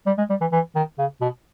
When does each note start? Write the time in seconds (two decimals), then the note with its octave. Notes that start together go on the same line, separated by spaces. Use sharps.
0.07 G3
0.18 G#3
0.30 G3
0.41 E3
0.52 E3
0.75 D#3
0.98 C#3
1.21 B2